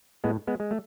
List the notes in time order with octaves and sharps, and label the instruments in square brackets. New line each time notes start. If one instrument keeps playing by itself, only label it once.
[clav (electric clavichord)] A2 G#3 B3
G#3 B3
G#3
A3